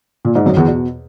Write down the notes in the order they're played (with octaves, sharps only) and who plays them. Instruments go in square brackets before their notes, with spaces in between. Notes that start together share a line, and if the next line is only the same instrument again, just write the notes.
[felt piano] A#2
G#2
F#2
E2
B2